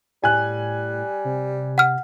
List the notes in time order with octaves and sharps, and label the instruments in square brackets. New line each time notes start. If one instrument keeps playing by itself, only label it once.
[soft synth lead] A2 [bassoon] G3 [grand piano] G#5 F#6
[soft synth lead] C3
[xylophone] F#5 F6